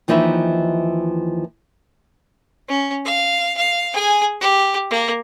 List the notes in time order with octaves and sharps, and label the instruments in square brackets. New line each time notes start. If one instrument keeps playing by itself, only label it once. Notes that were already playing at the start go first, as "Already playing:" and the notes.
[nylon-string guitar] D#2 E3 F3 D#4 B4 E5
[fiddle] C#4
F5
F5
G#4 G#5
G4
A#3